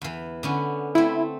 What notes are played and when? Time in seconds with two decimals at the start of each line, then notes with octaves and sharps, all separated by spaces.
0.02 E2 E3
0.43 D3 B3 C#4
0.95 A3 C4 E4